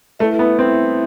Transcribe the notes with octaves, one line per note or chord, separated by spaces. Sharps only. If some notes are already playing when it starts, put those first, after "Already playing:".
A3 E4 B4 E5
B3
C4